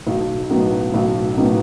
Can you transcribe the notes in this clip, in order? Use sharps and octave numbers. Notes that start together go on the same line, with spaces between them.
B1
A2 F#3 B3 D#4
B1
A2 F#3 B3 D#4